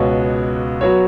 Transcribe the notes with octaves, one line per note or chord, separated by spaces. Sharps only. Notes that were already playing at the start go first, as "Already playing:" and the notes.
Already playing: C#2 B2 B3 F#4 C#5
F#3 B3 F#4 C#5